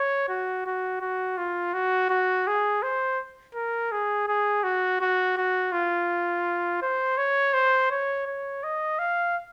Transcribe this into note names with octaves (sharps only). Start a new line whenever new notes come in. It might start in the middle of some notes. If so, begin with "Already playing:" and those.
Already playing: C#5
F#4
F#4
F#4
F4
F#4
F#4
G#4
C5
A#4
G#4
G#4
F#4
F#4
F#4
F4
C5
C#5
C5
C#5
C#5
D#5
F5